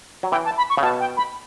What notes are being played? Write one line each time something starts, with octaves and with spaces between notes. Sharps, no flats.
F#3
E3 G5
A5
B5
C#6
C#3
B2 A5
G5
B5